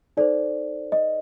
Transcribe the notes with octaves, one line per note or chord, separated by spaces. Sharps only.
D#4 A4 C5 D5
D#5